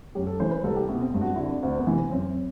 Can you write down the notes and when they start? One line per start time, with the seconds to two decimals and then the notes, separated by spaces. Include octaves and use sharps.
0.15 F#2 G4
0.27 A4
0.40 E3 C5
0.51 B4
0.64 C2 A4
0.76 G4
0.88 B2 E4
1.01 C4
1.14 G2
1.21 F#4
1.35 D3 E4
1.49 D4
1.63 D2 C4
1.79 B3
1.87 C3 E3 C4
2.11 F#2 C4